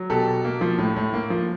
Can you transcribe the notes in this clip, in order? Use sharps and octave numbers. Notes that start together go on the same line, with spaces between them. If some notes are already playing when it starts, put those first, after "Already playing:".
Already playing: F#3
B2 G4 A4
B2
A#3
F3
A2
A2
A#3
F3